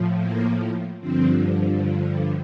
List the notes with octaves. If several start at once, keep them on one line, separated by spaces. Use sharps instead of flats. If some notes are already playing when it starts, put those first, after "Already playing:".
Already playing: A2 F3
A#3
G2 D3 F3 C4